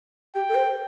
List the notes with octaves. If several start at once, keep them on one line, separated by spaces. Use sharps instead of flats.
G4 G5
A4
C5